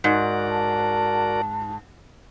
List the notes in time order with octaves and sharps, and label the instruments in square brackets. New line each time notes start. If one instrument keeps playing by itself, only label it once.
[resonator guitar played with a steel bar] G#2 [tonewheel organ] F#4 A#4 D5
[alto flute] A5